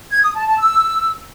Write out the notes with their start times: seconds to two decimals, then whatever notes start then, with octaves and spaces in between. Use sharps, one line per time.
0.11 G#6
0.23 D#6
0.35 A5
0.47 A5
0.59 E6